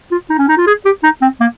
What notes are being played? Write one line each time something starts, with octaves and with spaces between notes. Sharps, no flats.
F4
D#4
C#4
D#4
F4
G#4
G4
D#4
C4
A#3